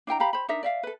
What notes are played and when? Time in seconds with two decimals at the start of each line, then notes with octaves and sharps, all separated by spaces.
0.07 D4 E4 G5 A#5
0.20 G4 F5 A#5 B5
0.33 C5 B5
0.49 D4 D#4 A#4 E5
0.63 D5 E5 F5
0.83 A4 B4